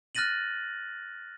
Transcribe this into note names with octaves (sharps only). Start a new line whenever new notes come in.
F6 F#6 A6 A#6 D#7 F#7